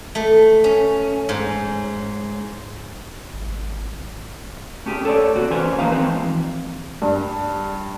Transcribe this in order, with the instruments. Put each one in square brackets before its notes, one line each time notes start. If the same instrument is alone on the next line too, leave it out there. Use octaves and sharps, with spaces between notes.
[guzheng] A3
C#4
G#2
[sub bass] G#1
[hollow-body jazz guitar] A3 C#4 G4 G#4
A4 C#5 D5
C3 A#3 F#4
D#3 E3 C#4 G#4 B4 C5
F3 A3 A#3 D#4 B4 F5
E3 F3 G#3 C4
[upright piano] G2